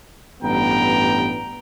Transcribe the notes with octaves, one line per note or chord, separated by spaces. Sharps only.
A1 G2 B3 G5 A#5